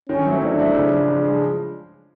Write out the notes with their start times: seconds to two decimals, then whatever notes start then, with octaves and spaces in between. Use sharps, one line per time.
0.09 D#3 C#4
0.25 F#3 A3 C4 E4
0.42 D#3 D4
0.59 F#3 A3 C4 E4
0.75 C#3
0.92 F3 G#3
1.08 C#3
1.25 F3 G#3